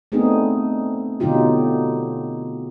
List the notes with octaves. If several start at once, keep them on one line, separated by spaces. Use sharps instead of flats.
A3 B3 C4 D4 D#4 G#4
B2 D3 F#3 D#4 F4 G4